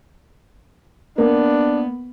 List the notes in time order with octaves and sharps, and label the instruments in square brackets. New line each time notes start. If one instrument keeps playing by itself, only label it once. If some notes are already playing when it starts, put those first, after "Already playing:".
[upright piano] A#3 [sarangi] B3 [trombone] D4